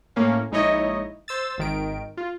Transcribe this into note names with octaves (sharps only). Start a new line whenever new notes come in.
A2 A#3 C#4 F5
A#1 G#3 D#4 E4 C#5 D#5
C5 E6 A6
G#1 D#3 D7
F4